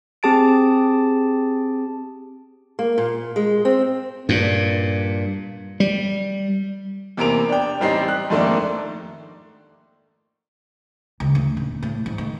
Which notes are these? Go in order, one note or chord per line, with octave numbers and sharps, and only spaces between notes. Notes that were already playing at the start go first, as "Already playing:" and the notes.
C4 G4 G#4 A5 A6 D7
A#3
A#2
G#3
C4
G2 A#2
G3
E2 C3 A#3 D7 F7
D4 G5
A1 G3 C4 D#4 G4 C7
F#6
F2 G#2 D#3 A3 A#3 D4
C#2
D2
D#1
A2
G#2
D#3